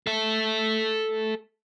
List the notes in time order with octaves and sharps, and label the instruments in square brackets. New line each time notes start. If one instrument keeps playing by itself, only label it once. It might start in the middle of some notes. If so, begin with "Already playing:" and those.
[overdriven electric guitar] A4 E5